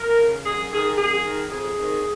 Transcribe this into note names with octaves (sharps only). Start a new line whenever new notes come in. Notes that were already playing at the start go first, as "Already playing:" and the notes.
Already playing: A#4
C#3
F#2 G#4
D#3 G#4
F#2 G#4
D#3
F2 G#4
C3 D#3